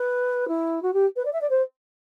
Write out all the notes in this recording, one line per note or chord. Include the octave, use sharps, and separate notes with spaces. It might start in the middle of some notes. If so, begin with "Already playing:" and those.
Already playing: B4
E4
F#4
G4
B4
D5
E5
D5
C5